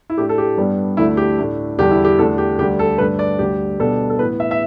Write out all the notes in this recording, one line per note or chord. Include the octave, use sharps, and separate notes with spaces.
E4
A2 A3 D4 G4
A4
G4
G2 G3 B3 D4
D2 D3 A3 D4 E4
G4
A2 A3 D4
E2 D3 G3 D4 G4
E4
G4
E2 D3 A3 D4 A4
G4
D2 D3 G3 G4
A4
G2 D3 A3 D4 B4
D5
D2 D3 G3 G4
B2 G3 B3 D4 A4
A4
A2 E3 B3 B4
E5
E5